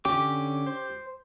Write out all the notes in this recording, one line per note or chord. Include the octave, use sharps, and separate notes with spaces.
D3 C#4 G4 D6
C5